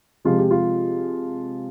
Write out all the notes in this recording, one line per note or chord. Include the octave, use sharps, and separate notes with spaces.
C3 F3 G#3 F4
G4
F4